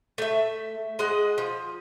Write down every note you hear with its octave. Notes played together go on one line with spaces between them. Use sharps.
A3 E5
G#3 D#5 F#5
F3